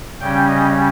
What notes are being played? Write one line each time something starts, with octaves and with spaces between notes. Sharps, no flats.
C#3 G3 C#4 G5
D#5